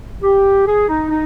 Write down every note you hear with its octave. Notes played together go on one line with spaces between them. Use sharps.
G4
G#4
D#4
D#4